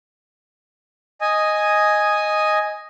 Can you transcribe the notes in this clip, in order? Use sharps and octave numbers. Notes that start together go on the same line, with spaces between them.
D#5 G#5 D#6